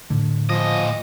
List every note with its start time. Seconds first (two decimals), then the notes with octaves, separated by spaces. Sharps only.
0.10 A2 D3
0.50 A#2 F3 D#5